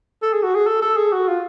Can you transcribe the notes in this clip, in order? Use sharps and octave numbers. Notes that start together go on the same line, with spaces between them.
A4
G#4
F#4
G#4
A4
A4
G#4
F#4
F4